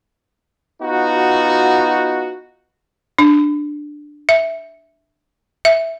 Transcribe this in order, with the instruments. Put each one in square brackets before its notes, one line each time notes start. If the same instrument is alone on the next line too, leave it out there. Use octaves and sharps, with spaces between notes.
[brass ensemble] B3 D#4 F4 F#4
[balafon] D4
E5
E5